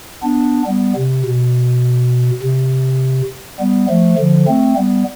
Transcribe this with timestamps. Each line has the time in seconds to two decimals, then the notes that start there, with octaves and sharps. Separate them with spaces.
0.23 B3 D4
0.67 G3 B3
0.96 C3
1.25 B2
2.42 C3
3.60 G3 B3
3.89 F3 A3
4.18 D3 F3
4.48 A3 C4
4.77 G3 B3